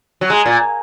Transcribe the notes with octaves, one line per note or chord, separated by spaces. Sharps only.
F#3
G#3
A#2